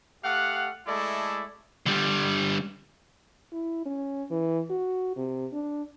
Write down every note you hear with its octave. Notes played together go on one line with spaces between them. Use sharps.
A3 G4 F5 F#5
G#3 A3 E4 A4 D5
D3 G3
E4
C#4
E3
F#4
C3
D4